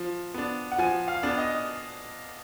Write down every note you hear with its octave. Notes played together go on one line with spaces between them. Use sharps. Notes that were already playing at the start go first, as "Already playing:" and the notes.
Already playing: F3
B3 D4
F#5
F3 G#5
F5
B3 D4
D#5